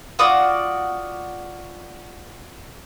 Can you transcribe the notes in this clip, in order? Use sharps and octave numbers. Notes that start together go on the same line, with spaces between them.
F4 F#4 D5 D#6